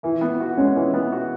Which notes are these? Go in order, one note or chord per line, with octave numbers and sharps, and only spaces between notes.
E3 E4
B3
F#4
G#3 C#4
E3
B3
F#4